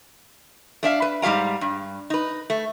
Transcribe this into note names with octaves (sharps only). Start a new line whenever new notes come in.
A3 D4 E5 F5
B4
G#2 G3 G4 F5 A#5
G2
D#4 B4
A3